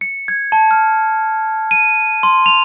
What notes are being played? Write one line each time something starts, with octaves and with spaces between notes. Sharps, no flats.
C#7
G#6
A5
F6
D#7
C6
F7